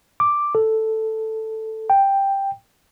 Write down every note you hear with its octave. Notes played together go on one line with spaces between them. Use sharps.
D6
A4
G5